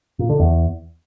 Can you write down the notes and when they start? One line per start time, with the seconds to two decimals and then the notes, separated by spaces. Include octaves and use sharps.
0.19 A#2
0.29 D3
0.40 E2